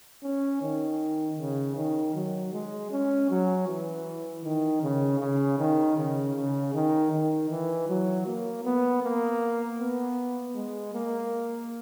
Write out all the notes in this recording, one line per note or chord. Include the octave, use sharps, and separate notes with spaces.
C#4
D#3
C#3
D#3
F#3
G#3
C#4
F#3
E3
D#3
C#3
C#3
D#3
C#3
C#3
D#3
D#3
E3
F#3
A#3
B3
A#3
B3
G#3
A#3